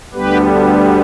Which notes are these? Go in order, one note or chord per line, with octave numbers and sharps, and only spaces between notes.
D2 D3 G3 B3 G4 B4